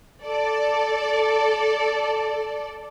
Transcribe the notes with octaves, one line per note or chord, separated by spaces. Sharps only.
A4 D5